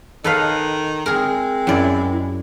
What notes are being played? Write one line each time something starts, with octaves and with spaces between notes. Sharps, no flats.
D#3 A4 B4 D#5 F5
G#3 C4 G#4 A#4
F#2 E4 D5